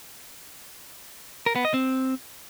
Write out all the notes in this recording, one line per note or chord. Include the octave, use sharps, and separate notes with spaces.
A#4
B3
D#5
C4